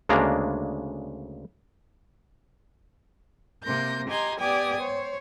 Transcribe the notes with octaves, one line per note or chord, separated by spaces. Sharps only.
D2 C#3 G#3 A#3 D4 A#5
C3 A#3 C6 G6 A#6
G4 D#5 G#5 A#5 C6 G6
B3 G4 D5 G5 G#5 D#6
C5 C#5